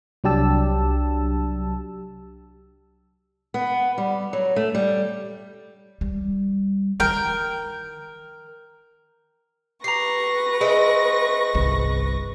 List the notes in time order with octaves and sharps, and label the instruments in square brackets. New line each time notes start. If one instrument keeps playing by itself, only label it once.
[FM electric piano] C2 F#3 D4 G4 A5 E6
[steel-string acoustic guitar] B3
G3
F#3
A3
G3
[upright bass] G3
[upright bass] D#3 E4 [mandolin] A#4 G5
[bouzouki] G4 [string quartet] B4 C#6 A#6 [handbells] A#5 C7
[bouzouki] D#4 C5 E5 [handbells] G#4
[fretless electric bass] G1 C2